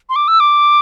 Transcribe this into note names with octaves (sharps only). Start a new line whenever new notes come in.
C6
D6
E6
D6